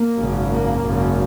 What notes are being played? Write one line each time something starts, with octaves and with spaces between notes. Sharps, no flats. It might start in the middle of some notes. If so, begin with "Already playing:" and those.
Already playing: A#3
G#1 F#2 C#3
A#3
G#1 F#2 C#3